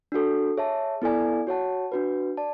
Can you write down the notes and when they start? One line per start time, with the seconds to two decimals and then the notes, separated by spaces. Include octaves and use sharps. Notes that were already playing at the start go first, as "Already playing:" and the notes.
0.12 D4 F#4 A4
0.57 G#4 C#5 E5 A5
1.02 B3 E4 A4 D5 G#5
1.47 F#4 C#5 F#5 A5
1.92 D4 F#4 B4
2.37 D5 A5